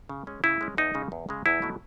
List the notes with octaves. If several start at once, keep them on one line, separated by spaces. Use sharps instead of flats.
C#3
G#3 C#4
C#3 E4
G#3 C#4
E2 D#4
C#3 G#3
E2
C#3 G#3
E2 E4
B2 F#3 A3